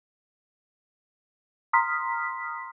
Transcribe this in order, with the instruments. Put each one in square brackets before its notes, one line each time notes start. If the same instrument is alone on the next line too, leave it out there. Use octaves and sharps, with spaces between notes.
[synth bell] A#5 C6 D#6 F6 B6